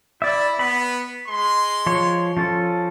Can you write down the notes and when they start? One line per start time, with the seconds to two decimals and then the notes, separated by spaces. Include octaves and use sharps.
0.22 E4 D5 E5
0.59 B3 B5
1.28 G#3 C6
1.86 F3 C#5
2.37 F3 C#4 A4